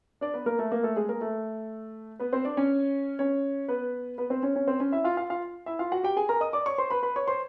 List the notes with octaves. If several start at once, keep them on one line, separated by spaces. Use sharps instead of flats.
D4 D5
B3 B4
A#3 A#4
A3 A4
A#3 A#4
A3 A4
G#3 G#4
A#3 A#4
A3 A4
B3 B4
C4 C5
D4 D5
C#4 C#5
C#4 C#5
B3 B4
B3 B4
C4 C5
C#4 C#5
C#4 C#5
C4 C5
C#4 C#5
E4 E5
F4 F5
F4 F5
F4 F5
E4 E5
F4 F5
F#4 F#5
G4 G5
G#4 G#5
A#4 A#5
D#5 D#6
D5 D6
C#5 C#6
C5 C6
B4 B5
B4 B5
C#5 C#6
C5 C6